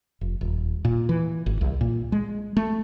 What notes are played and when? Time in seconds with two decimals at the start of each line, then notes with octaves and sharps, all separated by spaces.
0.21 F1
0.41 D#1
0.85 A#2
1.09 E3
1.46 G#1
1.61 C2
1.81 A#2
2.12 G#3
2.57 A3